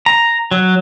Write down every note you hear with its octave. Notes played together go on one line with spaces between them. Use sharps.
A#5
F#3